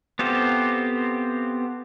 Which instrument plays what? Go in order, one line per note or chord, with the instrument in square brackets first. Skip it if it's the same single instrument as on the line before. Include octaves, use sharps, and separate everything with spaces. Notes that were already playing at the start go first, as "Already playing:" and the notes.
[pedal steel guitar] B3 C4 F4 G4 A4